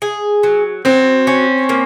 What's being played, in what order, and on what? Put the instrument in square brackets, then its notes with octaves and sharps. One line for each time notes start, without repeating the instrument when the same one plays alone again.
[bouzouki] G#4
F#3
[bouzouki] F#3 [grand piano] C4
[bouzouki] C#4
A#3